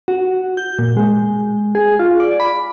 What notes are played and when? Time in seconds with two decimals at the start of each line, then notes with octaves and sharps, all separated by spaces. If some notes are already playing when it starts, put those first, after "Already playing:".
0.08 F#4
0.57 G6
0.79 A#2
0.97 G#3
1.75 G#4
1.99 F4
2.20 D5
2.40 B5